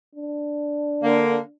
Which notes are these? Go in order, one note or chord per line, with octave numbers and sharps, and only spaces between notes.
D4
D3 A#3